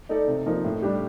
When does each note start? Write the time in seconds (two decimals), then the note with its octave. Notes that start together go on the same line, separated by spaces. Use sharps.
0.09 A3 D#4 A4 D5
0.28 C3
0.46 F3 A#3 D#4
0.64 A2
0.82 G3 D4 G4